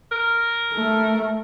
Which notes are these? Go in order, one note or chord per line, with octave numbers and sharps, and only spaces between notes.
A#4
A3